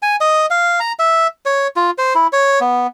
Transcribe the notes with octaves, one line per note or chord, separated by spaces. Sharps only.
G#5
D#5
F5
A#5
E5
C#5
F4
C5
E4
C#5
B3